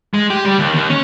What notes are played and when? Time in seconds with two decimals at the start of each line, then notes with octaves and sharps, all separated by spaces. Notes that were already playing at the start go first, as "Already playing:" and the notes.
0.14 G#3
0.30 G4
0.45 G3
0.59 D#2
0.74 D#2
0.90 C#4